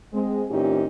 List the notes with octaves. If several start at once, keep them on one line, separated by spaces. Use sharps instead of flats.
G#3 C4
A#2 E3 C4 C#4 D#4 G4